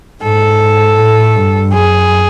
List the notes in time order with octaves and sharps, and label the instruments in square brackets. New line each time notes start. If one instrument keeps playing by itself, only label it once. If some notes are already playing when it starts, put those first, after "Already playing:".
[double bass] G#2 [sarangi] A4
[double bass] A2
G2
[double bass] F#2 [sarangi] G#4